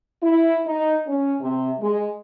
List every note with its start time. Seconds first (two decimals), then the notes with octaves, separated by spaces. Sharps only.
0.23 E4
0.66 D#4
1.06 C#4
1.40 C3
1.80 G#3